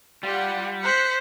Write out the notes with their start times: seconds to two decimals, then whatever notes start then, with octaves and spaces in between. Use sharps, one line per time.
0.23 G3 F4 G4 F#5
0.83 C5 F#6 B6 C#7